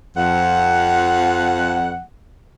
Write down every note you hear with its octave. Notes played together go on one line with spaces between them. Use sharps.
F2 F#5